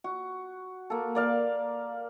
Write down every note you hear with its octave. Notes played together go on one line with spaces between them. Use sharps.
F#4
A#3 A4
A#3 D5 F5